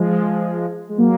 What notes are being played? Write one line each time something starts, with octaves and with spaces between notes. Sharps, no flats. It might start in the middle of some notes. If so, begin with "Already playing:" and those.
Already playing: F3 G#3
G#3
F#3 A#3